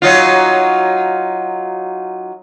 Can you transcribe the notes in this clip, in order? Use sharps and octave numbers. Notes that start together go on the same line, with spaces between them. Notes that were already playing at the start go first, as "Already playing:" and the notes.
F#3 D#4 F4